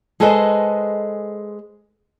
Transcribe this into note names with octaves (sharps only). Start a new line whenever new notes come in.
G#3 G#4 A4 B4 C5 D#5